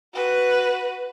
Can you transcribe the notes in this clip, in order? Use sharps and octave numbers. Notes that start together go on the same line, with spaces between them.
F#4 B4